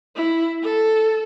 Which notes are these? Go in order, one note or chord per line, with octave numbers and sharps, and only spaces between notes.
E4
A4